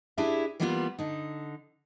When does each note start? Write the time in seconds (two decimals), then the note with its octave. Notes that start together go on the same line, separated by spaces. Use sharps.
0.18 D4 E4 G4 G#4 E5
0.60 E3 G3 A#3 B3 D#4 F4
0.99 D3 D#4